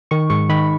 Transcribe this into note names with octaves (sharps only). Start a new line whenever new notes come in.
D#3 C#6
G#2 C#6
D#3 B5